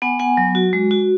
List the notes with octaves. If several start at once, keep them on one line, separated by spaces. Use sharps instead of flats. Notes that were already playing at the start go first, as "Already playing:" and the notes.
B3 F#5 G#5
B3 F#5 G#5
F#3
F#4
G#3
F#4